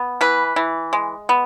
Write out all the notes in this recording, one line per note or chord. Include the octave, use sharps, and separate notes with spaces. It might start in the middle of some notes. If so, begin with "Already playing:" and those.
Already playing: B3
E3 B4
E3
G#3
B3